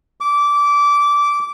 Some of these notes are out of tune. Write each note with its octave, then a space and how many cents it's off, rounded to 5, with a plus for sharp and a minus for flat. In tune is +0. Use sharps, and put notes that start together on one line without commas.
D6 -15